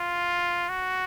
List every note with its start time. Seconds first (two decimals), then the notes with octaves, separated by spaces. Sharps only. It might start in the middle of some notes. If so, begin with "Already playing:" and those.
Already playing: F4
0.69 F#4